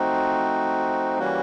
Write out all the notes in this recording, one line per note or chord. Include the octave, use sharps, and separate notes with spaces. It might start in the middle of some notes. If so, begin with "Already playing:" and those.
Already playing: F3 A3 C4 D#4 F#4
E3 G3 A#3 C#4 F#4